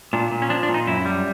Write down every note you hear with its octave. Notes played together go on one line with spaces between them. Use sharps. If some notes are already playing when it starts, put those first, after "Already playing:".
A#2 D4
A#2
C#4
F3 D4
D4
A#2
D#4
F#2 E4
G3